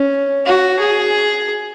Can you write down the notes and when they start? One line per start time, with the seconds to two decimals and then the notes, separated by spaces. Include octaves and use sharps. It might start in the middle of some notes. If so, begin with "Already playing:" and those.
Already playing: C#4
0.46 F#4
0.80 G#4